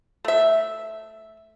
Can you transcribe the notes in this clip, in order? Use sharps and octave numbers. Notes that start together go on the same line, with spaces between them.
A3 E5